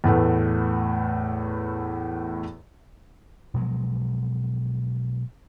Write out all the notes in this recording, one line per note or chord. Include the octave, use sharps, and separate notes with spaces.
E2 A2 A3 B3
B2 F3 F#3 G#3